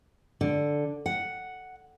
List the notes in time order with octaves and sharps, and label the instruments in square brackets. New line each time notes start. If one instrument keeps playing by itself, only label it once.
[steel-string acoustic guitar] D3
F#5